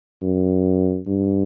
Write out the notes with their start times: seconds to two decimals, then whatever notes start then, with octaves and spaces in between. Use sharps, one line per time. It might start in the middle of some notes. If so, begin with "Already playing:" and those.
0.22 F#2
1.07 G2